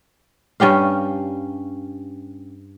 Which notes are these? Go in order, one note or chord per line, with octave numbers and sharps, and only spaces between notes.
G2 C#4 G4 F5